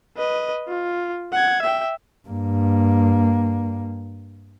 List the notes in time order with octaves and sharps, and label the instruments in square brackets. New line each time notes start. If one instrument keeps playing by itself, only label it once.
[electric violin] B4 D#5
F4
F#5 G#6
E5 G5
[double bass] G2 A#3